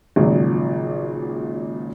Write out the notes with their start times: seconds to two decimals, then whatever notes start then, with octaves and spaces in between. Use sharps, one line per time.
0.16 G#1 A#2 C#3 F3 F#3